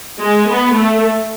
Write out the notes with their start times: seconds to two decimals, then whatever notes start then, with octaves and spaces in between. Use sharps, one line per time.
0.20 G#3
0.48 B3
0.76 A3